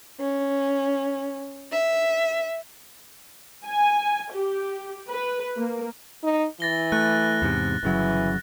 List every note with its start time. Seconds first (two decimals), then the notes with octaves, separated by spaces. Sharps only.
0.19 C#4
1.71 E5
3.64 G#5
4.32 G4
5.08 B4
5.57 A#3
6.23 D#4
6.60 E3 A6 A#6 G7
6.92 A3 F#6
7.42 E2 G#2 C3
7.83 G1 C#3 E3 F#3